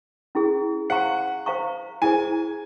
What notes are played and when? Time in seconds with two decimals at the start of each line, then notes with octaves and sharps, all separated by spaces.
0.35 C#4 E4 G#4
0.90 C5 F5 F#5 A#5 C#6
1.46 C5 F5 A#5 C#6
2.02 E4 G#4 C5 G#5